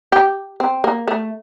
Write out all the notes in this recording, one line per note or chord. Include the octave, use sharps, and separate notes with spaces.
G4
C4
A#3
A3